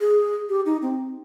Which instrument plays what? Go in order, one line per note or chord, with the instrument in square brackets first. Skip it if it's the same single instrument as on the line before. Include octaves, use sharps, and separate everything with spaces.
[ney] G#4
G4
D#4
C4